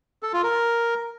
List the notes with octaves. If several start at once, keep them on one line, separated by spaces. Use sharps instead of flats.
A4
F4
A#4